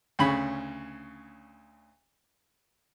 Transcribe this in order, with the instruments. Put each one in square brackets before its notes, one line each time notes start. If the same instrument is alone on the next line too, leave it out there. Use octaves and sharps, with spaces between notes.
[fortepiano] D2 C#3 C#4 B5